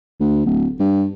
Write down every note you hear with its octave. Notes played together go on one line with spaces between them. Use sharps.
D2
D1
G2